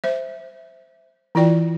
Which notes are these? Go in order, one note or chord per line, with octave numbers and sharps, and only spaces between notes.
C5 E5
E3 E4 F4 D5 G5